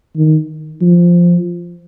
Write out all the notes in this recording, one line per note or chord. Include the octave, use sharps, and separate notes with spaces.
D#3
F3